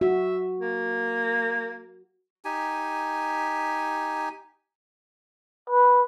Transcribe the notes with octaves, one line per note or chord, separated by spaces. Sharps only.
F#4 E5
A#3
D#4 G4 G#5
B4